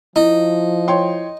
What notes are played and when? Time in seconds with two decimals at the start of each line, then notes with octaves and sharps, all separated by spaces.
0.16 F3 D#4 E4
0.88 C#5 G5 C6